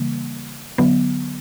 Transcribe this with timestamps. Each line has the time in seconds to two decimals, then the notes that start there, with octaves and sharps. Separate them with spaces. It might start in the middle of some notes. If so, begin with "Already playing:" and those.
Already playing: C#3 E3 G3 A#3
0.78 D3 F#3 B3